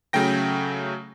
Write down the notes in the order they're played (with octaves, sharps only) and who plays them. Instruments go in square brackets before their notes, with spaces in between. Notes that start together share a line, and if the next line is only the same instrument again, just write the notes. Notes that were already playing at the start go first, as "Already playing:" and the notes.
[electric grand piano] C#3 F#3 A3 G5 A#6